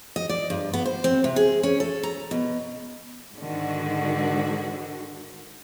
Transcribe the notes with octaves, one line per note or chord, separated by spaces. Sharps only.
D#5
D5
G2
B3
C5
C4
C3
G#4
C#4
A4
A#5
B2
G#2 D3 D#3 F#4